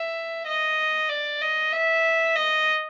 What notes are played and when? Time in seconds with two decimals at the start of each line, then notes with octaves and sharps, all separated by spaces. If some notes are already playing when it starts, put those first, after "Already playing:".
Already playing: E5
0.46 D#5
1.09 D5
1.42 D#5
1.73 E5
2.36 D#5